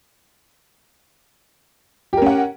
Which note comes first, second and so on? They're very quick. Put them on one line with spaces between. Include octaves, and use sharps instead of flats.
G4 A#4 C#4 F#5